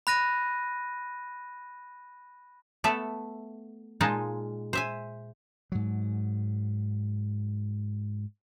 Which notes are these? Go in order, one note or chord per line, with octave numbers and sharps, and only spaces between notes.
B5 F#6 A#6 D#7
A3 B3 A4 E5
A#2 G#3 D#4 F4 A5
C5 E5 G#5
G#2 F#3